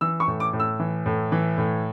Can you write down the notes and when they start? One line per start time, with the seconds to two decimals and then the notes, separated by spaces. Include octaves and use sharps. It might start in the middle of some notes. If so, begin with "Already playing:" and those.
0.01 E3 E6
0.20 C#6
0.28 A2
0.40 D6
0.53 A2
0.60 E6
0.80 E3
1.06 A2
1.32 E3
1.58 A2